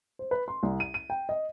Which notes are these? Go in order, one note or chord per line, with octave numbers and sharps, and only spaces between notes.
C5
B4
C6
C2
D#7
D#7
G5
D#5